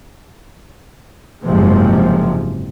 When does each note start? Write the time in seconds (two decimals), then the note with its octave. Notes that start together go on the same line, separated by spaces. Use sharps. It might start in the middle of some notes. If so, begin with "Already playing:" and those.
1.43 F#1 G#2 C3 F3 G#3